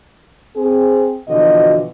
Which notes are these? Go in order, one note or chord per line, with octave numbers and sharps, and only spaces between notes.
C4 G#4
B2 D3 E3 F3 F#4 D#5